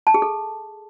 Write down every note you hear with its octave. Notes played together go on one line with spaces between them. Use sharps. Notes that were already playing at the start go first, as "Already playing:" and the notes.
A5
G#4
A4